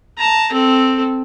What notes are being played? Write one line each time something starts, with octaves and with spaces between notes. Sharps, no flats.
A5 A#5
C4 A4